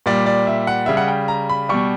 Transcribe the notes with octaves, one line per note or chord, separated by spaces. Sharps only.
A#2 G3 D5
D5
E5
F#5
C#3 G3 E5
F#5
G5
A#5
B5
B2 G3 C#6